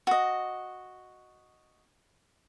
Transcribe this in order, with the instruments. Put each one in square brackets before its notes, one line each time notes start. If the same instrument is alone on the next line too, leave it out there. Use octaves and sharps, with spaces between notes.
[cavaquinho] F#4 D#5